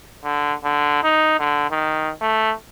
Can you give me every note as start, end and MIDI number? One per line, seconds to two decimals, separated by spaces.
0.24 0.54 50
0.64 1.03 50
1.03 1.38 63
1.39 1.68 50
1.71 2.11 51
2.21 2.53 57